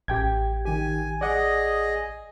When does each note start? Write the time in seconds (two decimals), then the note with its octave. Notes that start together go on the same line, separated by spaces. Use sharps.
0.08 A1 G4 G5 G#6
0.65 D#3 G4 G#5
1.21 G#4 D5 D#5 F#5